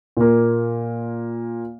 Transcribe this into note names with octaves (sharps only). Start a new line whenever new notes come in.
A#2 A#3